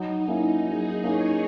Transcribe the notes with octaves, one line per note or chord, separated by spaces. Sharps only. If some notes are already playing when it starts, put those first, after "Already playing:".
Already playing: F#3 D#4
A#3 C#4 E4
F#3 G#4
A#3 C#4 E4 C#5